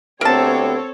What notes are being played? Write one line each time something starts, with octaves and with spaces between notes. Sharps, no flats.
D2 B3 C4 G4 A4 A#4 C#5 A5